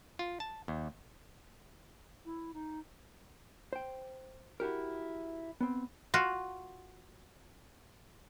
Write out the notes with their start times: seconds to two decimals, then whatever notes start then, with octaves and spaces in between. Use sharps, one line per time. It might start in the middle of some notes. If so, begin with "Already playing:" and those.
0.19 F4
0.40 A5
0.68 D#2
2.25 E4
2.54 D#4
3.73 C5 G5
4.60 E4 F#4 G4 A#4
5.61 B3 C4
6.14 F4 F#4